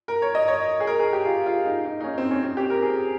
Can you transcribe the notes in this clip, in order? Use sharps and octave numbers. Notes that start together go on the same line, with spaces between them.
A#4
C#5
D#5
C#5
G#4
A#4
G#4
G4
F4
F4
D#4
D#4
D#4
C#4
C4
C#4
C4
G4
A#4
G#4